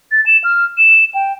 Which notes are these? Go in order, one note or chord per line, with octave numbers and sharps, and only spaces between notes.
A6
E7
F6
E7
G5